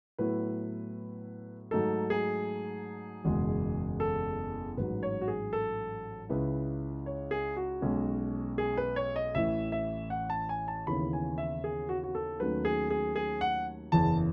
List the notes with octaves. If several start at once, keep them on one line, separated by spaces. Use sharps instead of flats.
A2 F#3 B3 E4 B4
G#2 F#3 A3 D#4 A4
G#4
F#1 E2 B2 G#3
A4
A1 G#2 F#3 B4
C#5
F#4
G#4
A4
C#2 C#3 G#3 C#4 E4 B4
C#5
G#4
F#4
B1 B2 G#3 C#4
G#4
B4
C#5
D#5
A1 A2 E3 E5
E5
F#5
A5
G#5
A5
D#2 C#3 E3 B3 E4 B5
G#5
E5
G#4
F#4
F#4
A4
D#2 D#3 F#3 A3 C#4 B4
G#4
G#4
G#4
F#5
F#1 E2 C#3 E3 A5